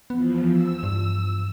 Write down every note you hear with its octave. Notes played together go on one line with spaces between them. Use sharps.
E2 F3 B3
E6
G2